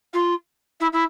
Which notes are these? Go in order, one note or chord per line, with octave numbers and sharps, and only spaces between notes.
F4
E4
E4